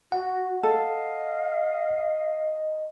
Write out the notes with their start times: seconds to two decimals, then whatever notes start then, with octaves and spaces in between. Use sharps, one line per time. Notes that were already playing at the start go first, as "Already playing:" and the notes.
0.12 F#4 F#5
0.63 A4 D#5 F5